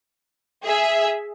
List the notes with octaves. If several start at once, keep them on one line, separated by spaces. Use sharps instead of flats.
G#4 E5